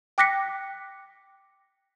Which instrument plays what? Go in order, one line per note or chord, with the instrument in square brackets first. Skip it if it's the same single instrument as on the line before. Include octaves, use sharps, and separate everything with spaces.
[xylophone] G5 D6 F#6 A#6 B6 C#7